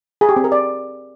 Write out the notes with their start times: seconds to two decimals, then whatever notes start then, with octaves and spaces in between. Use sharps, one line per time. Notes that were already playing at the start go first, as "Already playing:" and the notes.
0.21 G#4
0.29 G4
0.36 C4
0.44 A#4
0.52 D5